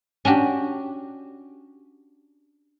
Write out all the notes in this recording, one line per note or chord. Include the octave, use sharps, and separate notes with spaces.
C#4 D4 F#4 G4